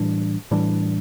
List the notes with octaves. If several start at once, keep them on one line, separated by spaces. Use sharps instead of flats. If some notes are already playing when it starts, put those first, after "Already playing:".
Already playing: A2 E3 G3 D4
A2 E3 G3 D4